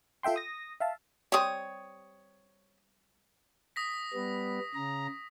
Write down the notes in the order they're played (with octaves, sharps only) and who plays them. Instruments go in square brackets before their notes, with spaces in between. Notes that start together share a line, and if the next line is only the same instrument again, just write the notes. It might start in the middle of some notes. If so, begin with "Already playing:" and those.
[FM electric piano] F4 A4 E5 G5 C6
D#6 A#6
E5 F5 A5
[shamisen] G3 C4 [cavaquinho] C#5 D#6
[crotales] D#6 A#6 B6
[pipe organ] G3 B3
C#3 A#5